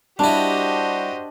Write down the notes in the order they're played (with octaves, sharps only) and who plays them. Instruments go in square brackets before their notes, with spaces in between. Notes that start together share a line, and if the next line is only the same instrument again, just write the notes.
[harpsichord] G3 E4 [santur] D4 D5 [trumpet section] F#4 C5 [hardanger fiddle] G4 D#5